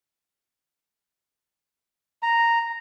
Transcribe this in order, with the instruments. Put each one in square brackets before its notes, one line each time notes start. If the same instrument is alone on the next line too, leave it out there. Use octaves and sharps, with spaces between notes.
[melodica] A#5